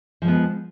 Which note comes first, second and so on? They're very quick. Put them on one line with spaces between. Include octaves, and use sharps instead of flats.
F3 G#3 B3